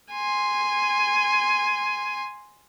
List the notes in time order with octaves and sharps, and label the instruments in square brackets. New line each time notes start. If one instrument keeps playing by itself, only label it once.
[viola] G#5 C6